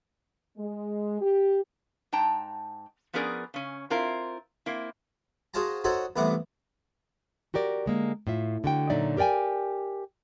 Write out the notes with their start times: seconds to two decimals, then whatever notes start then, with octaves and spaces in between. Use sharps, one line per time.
0.57 G#3
1.21 G4
2.13 G#2 G5 A5 A#5
3.13 F3 B3 C#4 G#4 A#4 D5
3.54 C#3 C#4
3.90 C4 E4 F4 A#4
4.66 A#3 C4 E4
5.54 F#4 G#4 C5 F5 A5 A#5
5.84 D#4 F#4 A4 C5 C#5 F#5
6.16 C2 A2 E3 B3 F#5 D6
7.54 F#4 G4 A#4 D5
7.86 D3 G#3 A#3
8.27 A2 F4 E5
8.64 D3 F#4 G5
8.90 A#2 D3 F#3 D#4 D5 E5
9.17 G4 A#4 D5 G5 G#5